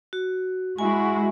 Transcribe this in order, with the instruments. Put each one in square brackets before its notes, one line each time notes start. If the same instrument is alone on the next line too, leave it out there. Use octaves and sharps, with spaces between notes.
[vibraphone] F#4
[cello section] G#3 E4 F#4 [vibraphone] G#5